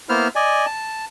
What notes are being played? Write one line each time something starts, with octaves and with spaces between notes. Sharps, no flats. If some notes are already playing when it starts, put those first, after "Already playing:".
A#3 B3 E4 C5 F6
D5 D#5 G#5
A5